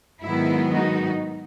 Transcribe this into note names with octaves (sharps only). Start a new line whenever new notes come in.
G#2 D#3 F#3 B3 E4
D#4 F#4